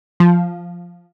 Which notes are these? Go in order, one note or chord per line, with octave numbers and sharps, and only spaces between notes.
F3